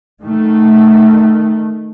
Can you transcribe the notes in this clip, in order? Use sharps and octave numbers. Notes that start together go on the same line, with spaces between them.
D#3 A3